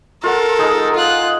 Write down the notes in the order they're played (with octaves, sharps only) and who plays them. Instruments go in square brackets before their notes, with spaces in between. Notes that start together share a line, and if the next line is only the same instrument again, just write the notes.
[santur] F4 F#5 [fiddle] A4 A#4
[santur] G#3 D#4 G#4
[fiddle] F4 F#6